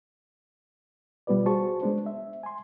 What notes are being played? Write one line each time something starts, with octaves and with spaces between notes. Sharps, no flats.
B2 G3 B3 F4 B4 D5
F#4 G#4 C5 A5 C#6
G#3 B3 D4 C5
E5
G#5 C6